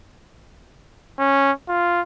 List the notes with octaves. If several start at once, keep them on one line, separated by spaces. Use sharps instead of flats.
C#4
F4